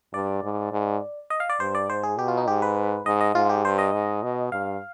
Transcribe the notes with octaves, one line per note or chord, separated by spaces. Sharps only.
G2 D5
G#2
G#2
D#5
F5
D5
G2 C5
D5
G#2 C5
G#4
B2 G4
F4
D#4
G#2 G4
B4
G#2 D#5
D#5
G#2 F4
G4
G2 C5
D#5
G#2
B2
G2 F5